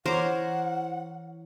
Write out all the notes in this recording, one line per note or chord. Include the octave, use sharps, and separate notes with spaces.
E3 A#4 C5 C#5 F#5 D6